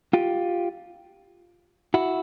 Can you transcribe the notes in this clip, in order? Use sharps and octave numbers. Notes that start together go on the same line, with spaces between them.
F4 G4
E4 F#4